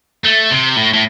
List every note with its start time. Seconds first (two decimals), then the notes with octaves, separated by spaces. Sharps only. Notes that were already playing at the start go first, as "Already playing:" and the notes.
0.24 A3
0.50 C3
0.76 A2
0.93 A2